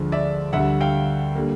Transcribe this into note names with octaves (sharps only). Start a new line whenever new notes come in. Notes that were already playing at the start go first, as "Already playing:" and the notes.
Already playing: D2 D3 F3 G#3
D5 E5
D2 D3 G3 E5 F#5
F5 G5
D3 G3 A#3